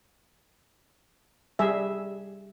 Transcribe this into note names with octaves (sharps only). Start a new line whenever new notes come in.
G3 G#4 E5